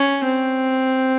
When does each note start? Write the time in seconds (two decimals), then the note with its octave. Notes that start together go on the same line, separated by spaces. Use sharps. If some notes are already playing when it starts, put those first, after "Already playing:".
Already playing: C#4
0.25 C4